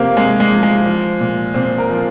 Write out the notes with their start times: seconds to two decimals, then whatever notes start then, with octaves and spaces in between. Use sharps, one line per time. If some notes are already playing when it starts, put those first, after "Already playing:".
Already playing: C3 F3 A#3 C4 G4
0.17 C3 G#3
0.40 G#3
0.52 F3
0.63 G#3
0.86 F3
1.20 A#2
1.54 A#2 C4
1.78 A#4
1.90 F3